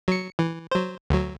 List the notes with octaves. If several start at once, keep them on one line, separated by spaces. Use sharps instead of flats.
F#3 C#7
E3
F#3 C5
D2 F#3